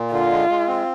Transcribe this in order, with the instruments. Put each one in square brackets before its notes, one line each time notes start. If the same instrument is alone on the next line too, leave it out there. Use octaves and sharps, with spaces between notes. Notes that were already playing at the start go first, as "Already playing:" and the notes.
Already playing: [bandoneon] A#2
[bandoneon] D3 [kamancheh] F4
[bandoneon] G#3
G#3
C4